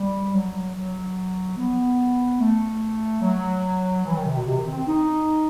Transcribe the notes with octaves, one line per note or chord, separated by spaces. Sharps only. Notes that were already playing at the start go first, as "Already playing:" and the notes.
Already playing: G3
F#3
F#3
B3
A3
F#3
E3
D#3
C3
B2
C3
D#3
C4
C4
D#4